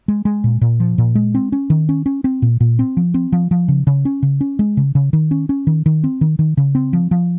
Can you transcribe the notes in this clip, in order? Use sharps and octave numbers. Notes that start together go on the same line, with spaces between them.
G#3
G#3
A#2
A#2
F3
A#2
G#3
C4
C#4
D#3
C#4
C#4
C4
A#2
A#2
C4
F3
C4
F3
F3
C#3
C#3
C#4
C#3
C#4
G#3
C#3
C#3
D#3
C#4
C#4
D#3
D#3
C4
D#3
D#3
C#3
C4
F3
F3